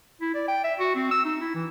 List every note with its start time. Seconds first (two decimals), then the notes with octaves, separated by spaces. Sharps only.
0.21 E4
0.35 D5
0.48 G5
0.64 E5
0.79 F#4
0.95 C4
1.11 E6
1.25 D#4
1.41 E4
1.54 E3